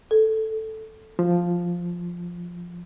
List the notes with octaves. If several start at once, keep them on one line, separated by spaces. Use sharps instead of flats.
A4
F3